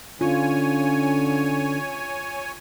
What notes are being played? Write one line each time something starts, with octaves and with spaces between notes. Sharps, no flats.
D3 C#4 F4 C#5 G#5